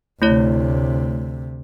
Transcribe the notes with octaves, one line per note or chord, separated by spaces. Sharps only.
D2 C3 A3 E4 C#5